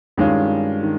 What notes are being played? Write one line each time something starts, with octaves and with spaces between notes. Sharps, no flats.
G2 D#3 G#3 C#4 F4
D#3